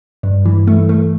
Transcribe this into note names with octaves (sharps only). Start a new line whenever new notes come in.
G2
E3
A3
A3